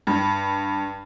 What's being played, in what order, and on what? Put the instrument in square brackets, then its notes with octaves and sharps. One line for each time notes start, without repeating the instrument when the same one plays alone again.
[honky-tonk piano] G2